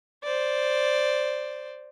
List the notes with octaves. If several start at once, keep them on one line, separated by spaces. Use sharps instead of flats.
C5 D5